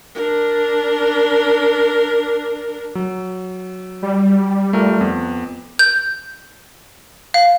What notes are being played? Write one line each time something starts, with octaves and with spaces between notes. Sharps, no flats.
D4 A#4
F#3
G3
A3 F4 A#4
F2 B3
G6
F5